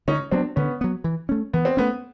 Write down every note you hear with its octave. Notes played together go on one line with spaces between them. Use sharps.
D3 C#4 D#4
F#3 B3 C4 D4
D3 B3 C#4
F#3 B3
E3
A3 C#4
E3 B3
C4
A3 B3 C#4